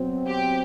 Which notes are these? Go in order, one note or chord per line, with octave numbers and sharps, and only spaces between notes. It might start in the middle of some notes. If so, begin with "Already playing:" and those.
Already playing: B2 F#3 C4
G4